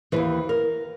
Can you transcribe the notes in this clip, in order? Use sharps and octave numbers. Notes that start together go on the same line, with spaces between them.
D#2 C#3 E3 B4
A#4